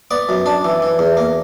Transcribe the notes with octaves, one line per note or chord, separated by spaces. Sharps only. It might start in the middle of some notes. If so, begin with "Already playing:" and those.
B3 D5
F#2
D4
E3
E3
E2
A#3